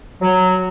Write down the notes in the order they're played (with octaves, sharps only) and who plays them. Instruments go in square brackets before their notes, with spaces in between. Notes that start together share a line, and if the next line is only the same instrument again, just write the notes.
[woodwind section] F#3